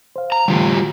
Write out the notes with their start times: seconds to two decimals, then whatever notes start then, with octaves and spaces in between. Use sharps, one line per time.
0.16 C5 F5
0.32 A#5
0.48 D3 E3 G3 A3 F4 G4
0.76 F#4